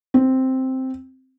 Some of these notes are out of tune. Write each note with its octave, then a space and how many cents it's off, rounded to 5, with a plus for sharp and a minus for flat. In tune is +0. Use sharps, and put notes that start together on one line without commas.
C4 +0